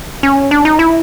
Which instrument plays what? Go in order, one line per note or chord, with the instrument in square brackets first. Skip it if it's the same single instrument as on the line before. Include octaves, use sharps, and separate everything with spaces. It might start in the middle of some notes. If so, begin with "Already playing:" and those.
[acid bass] C#4
D4
D#4
E4